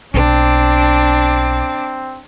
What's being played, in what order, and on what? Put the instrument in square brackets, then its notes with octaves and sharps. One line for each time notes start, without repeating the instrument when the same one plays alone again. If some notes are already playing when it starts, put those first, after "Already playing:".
[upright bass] B1 [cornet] C4 [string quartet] D4 D6